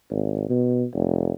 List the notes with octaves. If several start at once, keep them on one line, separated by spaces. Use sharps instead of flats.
G#1
B2
F1